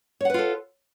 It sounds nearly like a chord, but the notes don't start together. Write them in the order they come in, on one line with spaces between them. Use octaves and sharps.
C#5 F#5 B4 F4 A4